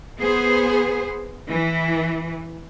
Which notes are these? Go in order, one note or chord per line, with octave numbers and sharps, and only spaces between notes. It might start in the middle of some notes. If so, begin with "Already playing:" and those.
B3 G#4 C5
E3